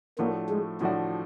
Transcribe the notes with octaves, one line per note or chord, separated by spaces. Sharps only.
A2 F3 A3 A#3 D4 F#4
G#3
A2 F3 F#3 A3 D4 F#4